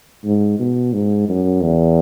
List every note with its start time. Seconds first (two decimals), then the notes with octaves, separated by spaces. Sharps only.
0.25 G#2
0.59 B2
0.93 G#2
1.29 F#2
1.63 E2